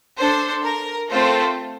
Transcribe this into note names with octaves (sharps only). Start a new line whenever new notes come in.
D4 A4 C5
A#4
A3 C4 F4 A4 C5